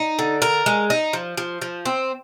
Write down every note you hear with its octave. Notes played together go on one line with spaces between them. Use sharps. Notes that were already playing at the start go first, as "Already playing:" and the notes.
Already playing: D#4
D3
A#4
G#3
D#4
F3
F3
F3
C4